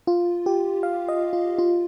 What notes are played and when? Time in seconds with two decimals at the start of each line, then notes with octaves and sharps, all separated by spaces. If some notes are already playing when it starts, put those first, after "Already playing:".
0.07 F4
0.46 G4
0.83 F5
1.08 D#5
1.33 F4
1.58 F4